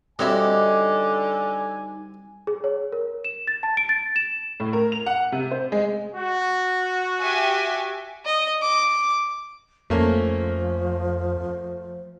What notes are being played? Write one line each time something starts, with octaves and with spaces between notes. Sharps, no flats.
D3 G3 C4 D#4 F#4 C#5 E5 G#5
G#4
C#5
A#4
E7
A6
A5
D7
A6
E7
A2
A#4
F7
F#5
C3
C5
G#3
F#4
G4 E5 G#5
D#5
D6
F2 F3 A3 A#3 C#4